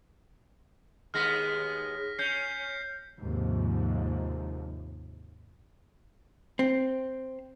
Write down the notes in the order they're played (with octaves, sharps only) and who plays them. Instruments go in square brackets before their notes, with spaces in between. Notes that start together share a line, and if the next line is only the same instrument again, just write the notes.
[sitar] D#2 G#3 B3 [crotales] F6 A#6 B6
[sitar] C#4 [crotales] G6 C7
[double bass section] D#2 G#2 C3 F3
[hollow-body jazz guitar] C4